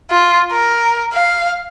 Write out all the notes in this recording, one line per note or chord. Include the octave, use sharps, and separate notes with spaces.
F4
A#4
F5